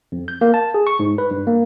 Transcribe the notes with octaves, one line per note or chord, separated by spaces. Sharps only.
F2
G6
A#3
A5
G#4
C#6
G#2
B4
G2
A#3